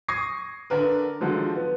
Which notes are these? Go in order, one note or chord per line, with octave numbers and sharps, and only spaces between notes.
C#6 D#6 G#6 A#6 C7
D3 D4 A#4 B4
D3 D#3 F3 F#3 G#3
B3